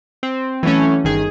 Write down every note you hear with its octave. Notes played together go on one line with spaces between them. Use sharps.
C4
E3 F#3 A3 C#4
G1 D#3 G#4